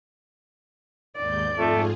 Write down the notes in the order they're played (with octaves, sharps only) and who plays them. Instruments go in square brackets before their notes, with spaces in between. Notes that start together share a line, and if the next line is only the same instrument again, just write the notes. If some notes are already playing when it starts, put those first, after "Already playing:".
[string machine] D#2 G#2 G6 [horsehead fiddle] D5
[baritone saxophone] F2 [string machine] G#2 F4 G#4 [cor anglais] A3